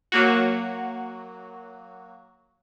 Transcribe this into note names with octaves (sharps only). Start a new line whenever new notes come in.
F#3 A#3 F#4